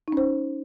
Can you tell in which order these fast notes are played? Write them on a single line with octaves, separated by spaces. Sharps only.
D#4 C#4 C5